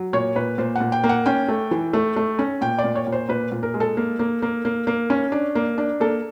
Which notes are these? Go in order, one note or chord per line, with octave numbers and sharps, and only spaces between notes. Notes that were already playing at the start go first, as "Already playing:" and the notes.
Already playing: F#3
A#2 C#5
A#2 B4
A#2 C5
A#2 F#5
G5
A#3
F#5
C#4 G5
A3
E3
A3
A3
C#4
A#2 G5
D5
A#2
C#5
A#2
C5
A#2 B4
A#2
A#4
G#3
A4
A#3
A#3
A#3
A#3
A#3
C#4
D4
A#3
D4
A#3 A4